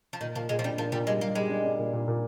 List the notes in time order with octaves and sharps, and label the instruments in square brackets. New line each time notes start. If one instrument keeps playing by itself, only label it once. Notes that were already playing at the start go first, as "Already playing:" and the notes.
[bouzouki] F3
[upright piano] A#2 [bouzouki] D#3
[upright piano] A#2 [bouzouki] F3
[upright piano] A#2 [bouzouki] G#3
[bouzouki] F3
[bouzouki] G3 [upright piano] D4
[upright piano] A#2 [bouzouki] F3
[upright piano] A#2 [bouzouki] G3
[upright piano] G3 [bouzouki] G#3
[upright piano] G3 [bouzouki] A#3
[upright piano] G3 [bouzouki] G#3
[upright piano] D4
D4
A#2
A#2
A#2